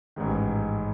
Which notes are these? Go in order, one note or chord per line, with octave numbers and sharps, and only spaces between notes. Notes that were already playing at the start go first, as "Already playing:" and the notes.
A1 G#2 D#3